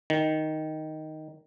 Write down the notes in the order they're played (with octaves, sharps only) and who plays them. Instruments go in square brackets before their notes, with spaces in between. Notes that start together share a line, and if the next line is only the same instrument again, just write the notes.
[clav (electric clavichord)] D#3